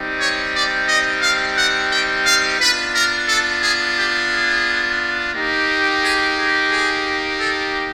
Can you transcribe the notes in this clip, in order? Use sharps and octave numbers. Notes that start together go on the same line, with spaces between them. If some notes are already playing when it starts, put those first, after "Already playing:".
Already playing: G3 C4 D#4 G4
C#5
D5
D#5
F5
F#5
G5
F5
B3 D4 F4 B4
A#4
A4
G#4
G4
G#4
A#3 D#4 G4
G#4
G#4
G#4
A4